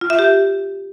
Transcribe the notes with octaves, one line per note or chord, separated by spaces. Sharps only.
F4
E5
G4